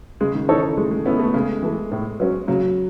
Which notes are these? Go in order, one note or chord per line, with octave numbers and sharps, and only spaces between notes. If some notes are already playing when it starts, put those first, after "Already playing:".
C#3 G#3
D#3
E3 D#4 A4 C#5
G#3 A3
G#3
B3 C#4 E4
A3
C#3 G#3
E3 A3
A2
F#3 C#4
C#3 F#3